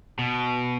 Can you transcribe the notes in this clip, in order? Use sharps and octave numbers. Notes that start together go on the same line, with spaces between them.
B2